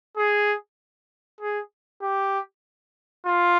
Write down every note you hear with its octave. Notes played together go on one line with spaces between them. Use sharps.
G#4
G#4
G4
F4